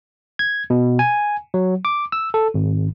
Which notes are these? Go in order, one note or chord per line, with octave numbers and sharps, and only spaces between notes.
G#6
B2
G#5
F#3
D6
E6
A4
G#1